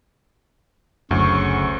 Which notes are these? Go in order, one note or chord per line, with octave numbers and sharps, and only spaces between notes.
F#1 D2 C#3 F#3 C#6